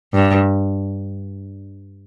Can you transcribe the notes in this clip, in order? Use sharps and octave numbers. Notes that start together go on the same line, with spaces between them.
G2